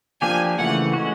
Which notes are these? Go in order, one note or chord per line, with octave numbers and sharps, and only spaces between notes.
F3 A#3 D4 G4 G#5
C#3 E3 A3 F#5
G#3 C#4 F#4